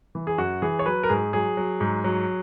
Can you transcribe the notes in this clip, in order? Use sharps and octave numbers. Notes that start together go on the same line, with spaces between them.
E3
G#4
F#2 F#4
E3 G#4
C#5
F#3 B4
A#4
G#2 G#4
F#3 G#4
F#3
G#2
F#3